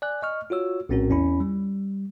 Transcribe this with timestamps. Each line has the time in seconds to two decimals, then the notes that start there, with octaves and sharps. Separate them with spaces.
0.02 D5 G#5 F#6
0.23 D#5 C#6 F6
0.50 F4 F#4 C#5 E6
0.89 A#1 A2 C4 C#4 F#4 A#4
1.10 E2 C#4 E4 B5
1.40 G3